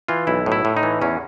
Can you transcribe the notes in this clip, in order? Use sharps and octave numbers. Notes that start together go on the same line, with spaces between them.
E3 F4
B1 E4
A2
E4
A2
D#4
E3
E2 C#4